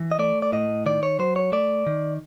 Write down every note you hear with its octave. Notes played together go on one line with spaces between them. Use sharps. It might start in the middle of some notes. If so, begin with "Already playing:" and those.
Already playing: E3
D#5
A3 D5
D5
A2 D#5
D#3 D5
C#5
F#3 C5
C#5
A3 D5
D#3